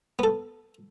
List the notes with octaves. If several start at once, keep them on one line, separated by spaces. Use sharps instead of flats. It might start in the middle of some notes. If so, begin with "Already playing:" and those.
B3 A4